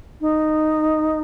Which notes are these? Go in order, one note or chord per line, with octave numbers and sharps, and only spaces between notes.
D#4